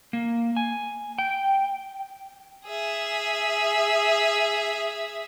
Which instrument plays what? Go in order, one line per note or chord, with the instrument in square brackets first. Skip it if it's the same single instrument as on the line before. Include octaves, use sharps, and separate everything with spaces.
[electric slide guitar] A#3
G#5
G5
[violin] G#4 E5